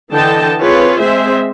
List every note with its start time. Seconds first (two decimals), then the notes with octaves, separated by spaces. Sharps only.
0.12 D3 E3 D#5 G5 A5
0.61 C4 F4 G#4 B4 C#5
0.99 G#3 C4 G#4 C5 E5